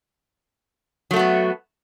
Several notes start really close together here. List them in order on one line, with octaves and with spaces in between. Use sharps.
F#3 A3 F#4 B3